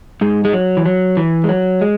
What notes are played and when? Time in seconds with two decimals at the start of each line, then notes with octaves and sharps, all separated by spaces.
0.21 G#2 G#3
0.45 G#3
0.53 F#3
0.77 E3
0.86 F#3
1.17 E3
1.44 G#3
1.49 F#3
1.81 G#3